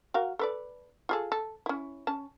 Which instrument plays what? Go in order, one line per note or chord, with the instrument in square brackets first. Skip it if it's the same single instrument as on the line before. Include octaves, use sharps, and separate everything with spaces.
[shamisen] F#4 A#4 F5
A4 B4 D5
F4 G#4 A4
A4
C#4 E4
C#4 A5